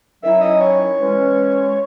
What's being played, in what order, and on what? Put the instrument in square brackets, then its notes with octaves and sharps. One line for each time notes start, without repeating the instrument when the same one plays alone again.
[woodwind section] D#3 F#3 C#4 E4 [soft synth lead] E5
[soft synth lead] D#5
C#5
[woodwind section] E3 G#3 C#4